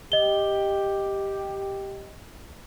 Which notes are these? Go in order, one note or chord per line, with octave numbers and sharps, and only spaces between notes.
G4 D#5 G7